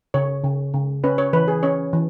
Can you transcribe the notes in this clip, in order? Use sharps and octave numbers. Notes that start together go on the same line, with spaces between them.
C#3 C#5
C#3
C#3
C#4 B4
C#5
E3 B4
G#4
C#4 C#5
E3